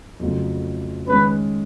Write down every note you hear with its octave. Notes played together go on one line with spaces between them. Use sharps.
F2 C#3 F#3 A3
D#3 G#3 C#4 B4